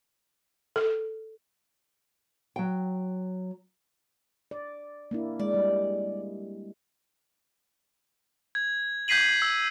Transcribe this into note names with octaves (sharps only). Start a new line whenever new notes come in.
A4
F#3 G5
D5
A#3 D4 E4
G#3 D5
G3
G#6
G6 G#6 B6 C7 D#7 F#7
E6